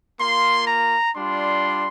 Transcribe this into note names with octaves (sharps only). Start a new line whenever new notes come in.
A#3 F4 C6
A#5
G3 D4 F4 C6